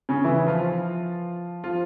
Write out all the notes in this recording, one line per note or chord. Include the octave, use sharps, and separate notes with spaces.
C#3 C#4
E3 E4
F3 F4
F3 F4